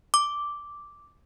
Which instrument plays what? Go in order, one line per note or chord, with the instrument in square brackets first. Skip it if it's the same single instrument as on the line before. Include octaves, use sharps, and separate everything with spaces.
[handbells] D6